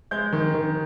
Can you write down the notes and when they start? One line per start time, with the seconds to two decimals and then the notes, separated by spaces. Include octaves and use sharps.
0.11 G#3 G6
0.33 D#3
0.54 D#3